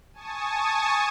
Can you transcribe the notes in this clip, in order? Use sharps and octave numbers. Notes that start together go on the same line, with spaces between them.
G#5 A5 C#6 D#6